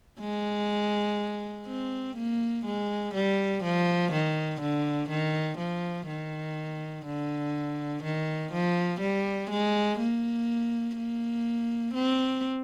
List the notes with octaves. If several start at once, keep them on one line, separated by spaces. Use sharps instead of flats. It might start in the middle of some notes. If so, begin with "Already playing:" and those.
G#3
C4
A#3
G#3
G3
F3
D#3
D3
D#3
F3
D#3
D3
D#3
F3
G3
G#3
A#3
A#3
C4